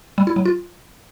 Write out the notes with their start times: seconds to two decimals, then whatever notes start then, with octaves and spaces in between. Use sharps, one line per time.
0.18 G3
0.27 E4
0.36 F#3
0.45 F4